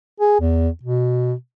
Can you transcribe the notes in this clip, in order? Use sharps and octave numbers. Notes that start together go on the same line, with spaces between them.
G#4
E2
B2